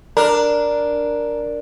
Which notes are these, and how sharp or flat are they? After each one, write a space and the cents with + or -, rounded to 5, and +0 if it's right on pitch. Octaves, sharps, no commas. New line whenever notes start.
D4 +0 A#4 +0